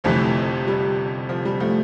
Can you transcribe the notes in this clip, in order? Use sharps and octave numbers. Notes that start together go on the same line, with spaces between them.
G1 F2 C3 E3 F3 A3
G3
F3
G3
F3 A3